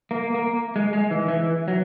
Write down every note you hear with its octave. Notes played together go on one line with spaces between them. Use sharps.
A#3
A#3
G#3
G#3
E3
E3
F#3